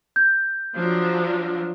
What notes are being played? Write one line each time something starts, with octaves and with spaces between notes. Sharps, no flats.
G6
F3 F#3 D4